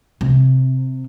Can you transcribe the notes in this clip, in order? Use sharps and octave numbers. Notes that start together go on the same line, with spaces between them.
C3